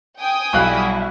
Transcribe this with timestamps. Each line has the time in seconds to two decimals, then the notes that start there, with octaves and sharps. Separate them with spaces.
0.19 G5 G#5 D#6
0.53 B1 G3 E4 F#4 F5 F#6